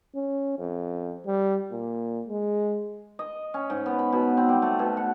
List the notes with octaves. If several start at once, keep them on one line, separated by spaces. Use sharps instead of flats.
C#4
F2
G3
A#2
G#3
D#5
C#4
G#2
B3
B5
B2
C4
G3
A3
B2
F#5